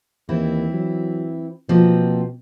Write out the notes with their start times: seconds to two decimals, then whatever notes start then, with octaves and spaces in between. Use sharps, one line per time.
0.29 D#2 E3 C4 E4
0.73 F#3
1.69 B2 F3 A#3 C4